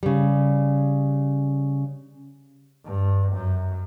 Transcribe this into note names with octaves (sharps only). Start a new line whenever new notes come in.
C#3 G3
G2
F#2